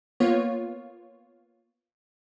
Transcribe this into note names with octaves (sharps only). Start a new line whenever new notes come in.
A#3 B3 F4 C#5